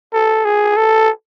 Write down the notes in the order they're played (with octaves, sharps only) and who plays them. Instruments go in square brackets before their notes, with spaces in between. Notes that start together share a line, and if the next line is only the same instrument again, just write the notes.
[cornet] A4
G#4
A4